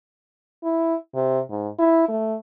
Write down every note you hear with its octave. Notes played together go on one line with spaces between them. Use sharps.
E4
C3
G#2
E4
A3